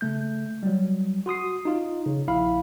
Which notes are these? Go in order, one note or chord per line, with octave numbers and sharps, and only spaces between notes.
C#3 A3 G6
F#3 G3
F#4 C6 D#6 C7
D#4 F4
C#3
A#1 E4 F5 B5